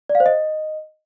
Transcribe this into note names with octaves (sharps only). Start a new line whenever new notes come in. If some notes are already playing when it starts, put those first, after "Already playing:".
D5
F5
C5
D#5